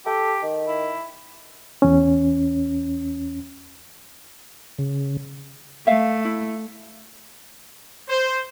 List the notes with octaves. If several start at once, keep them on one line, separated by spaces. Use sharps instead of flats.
G4 A4
D#3
E4
E2 C#4
C#3
A3 E5 F5
E4
C5